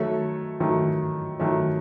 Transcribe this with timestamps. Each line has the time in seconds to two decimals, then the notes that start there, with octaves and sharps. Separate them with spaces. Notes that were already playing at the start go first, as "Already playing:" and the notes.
Already playing: D#3 F#3 A3 A4 C#5
0.60 D#3 F#3 A3
1.39 D#3 F#3 A3